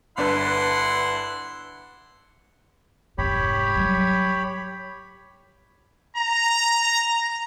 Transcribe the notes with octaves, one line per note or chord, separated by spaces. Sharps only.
G1 D4 E4 B4 F#5 C6
F1 G#2 G4 C#5 B5
F#3 G3
A#5